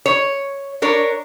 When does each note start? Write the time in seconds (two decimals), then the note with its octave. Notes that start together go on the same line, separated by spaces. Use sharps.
0.06 C#5
0.82 D4 A#4 C#5